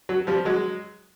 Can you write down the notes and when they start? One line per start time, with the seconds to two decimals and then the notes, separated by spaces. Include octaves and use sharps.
0.09 F#3
0.27 F3 G3
0.45 F#3 G#3